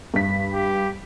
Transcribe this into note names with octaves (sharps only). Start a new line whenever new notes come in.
G2 B6
G4